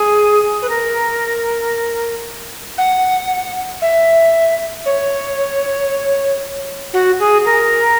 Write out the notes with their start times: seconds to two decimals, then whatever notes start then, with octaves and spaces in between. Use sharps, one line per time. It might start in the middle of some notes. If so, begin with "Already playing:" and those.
Already playing: G#4
0.62 B4
0.69 A#4
2.77 F#5
3.81 E5
4.85 C#5
6.93 F#4
7.19 G#4
7.45 A#4